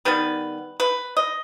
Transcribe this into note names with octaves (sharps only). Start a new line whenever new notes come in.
D#3 G3 B3 B4
B4
D#5